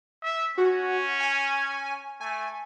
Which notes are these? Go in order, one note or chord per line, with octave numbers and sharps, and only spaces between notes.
E5
C#4 F#4
G#5
A3 G#5